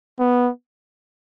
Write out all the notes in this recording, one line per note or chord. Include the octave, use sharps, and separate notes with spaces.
B3